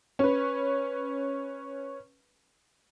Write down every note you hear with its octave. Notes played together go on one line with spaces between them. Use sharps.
C#4 B4